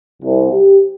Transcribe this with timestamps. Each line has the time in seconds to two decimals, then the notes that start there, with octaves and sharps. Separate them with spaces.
0.22 C2
0.52 G4